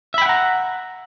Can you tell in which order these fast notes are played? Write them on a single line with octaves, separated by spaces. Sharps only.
E5 B5 G5 F#5 A#5